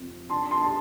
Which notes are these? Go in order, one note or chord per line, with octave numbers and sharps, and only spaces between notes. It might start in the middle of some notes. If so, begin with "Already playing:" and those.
Already playing: F2
D4 A5 C6
A5 C6
A5